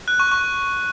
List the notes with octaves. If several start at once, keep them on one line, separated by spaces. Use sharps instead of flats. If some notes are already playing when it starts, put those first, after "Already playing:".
F#6
C#6
C#6